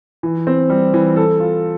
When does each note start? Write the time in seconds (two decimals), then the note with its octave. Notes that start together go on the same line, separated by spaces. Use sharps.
0.23 E3
0.47 C4
0.69 G3
0.94 E3
1.16 A4
1.40 F4